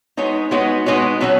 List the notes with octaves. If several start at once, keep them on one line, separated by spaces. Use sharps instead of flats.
G#3 B3 D#4 F#4 C#5
G#3 B3 D#4 F#4 C#5
G#3 B3 D#4 F#4 C#5
B2 F#3 C#4 F#4